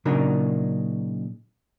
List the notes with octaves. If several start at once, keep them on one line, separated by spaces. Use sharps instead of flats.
A#2 C#3 F#3 D4 D#4 A#4